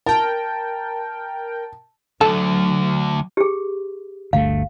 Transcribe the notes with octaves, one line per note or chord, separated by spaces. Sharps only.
A#4 G5 A5
D2 D3 F#3 A4
G4 G#4
G1 D2 A3 F5